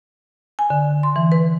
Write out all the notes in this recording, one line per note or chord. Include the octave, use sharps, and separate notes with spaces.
G#5
D3
C6
E3
B4